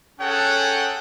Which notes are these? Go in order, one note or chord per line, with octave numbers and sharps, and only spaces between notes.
C#4 G#4 A4 C#5 F#5 G5